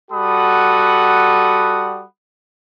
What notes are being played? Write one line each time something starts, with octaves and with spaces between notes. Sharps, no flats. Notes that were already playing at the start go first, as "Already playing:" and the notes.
G3 F#4 A4 F#5 B5 D#6